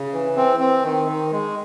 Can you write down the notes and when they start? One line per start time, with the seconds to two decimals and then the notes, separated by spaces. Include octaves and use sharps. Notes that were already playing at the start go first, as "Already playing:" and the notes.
Already playing: C#3
0.13 E3
0.37 C4
0.60 C4
0.83 D#3
1.08 D#3
1.32 G#3